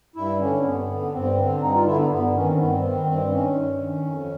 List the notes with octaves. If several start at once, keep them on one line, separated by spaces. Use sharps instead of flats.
G2 E4
D3 C#4
C4
G2 B3
D3
G2 C4
D3
G2 D#4
F4
D3 E4
B3
G2 B3
D#3 C#4
C4
G2 B3
C4
D#3
G2 C4
D#3 C#4
G2
D#3
F2